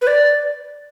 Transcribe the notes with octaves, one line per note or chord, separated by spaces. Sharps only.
B4
D5